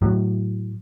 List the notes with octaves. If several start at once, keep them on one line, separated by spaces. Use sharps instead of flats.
A2 F#3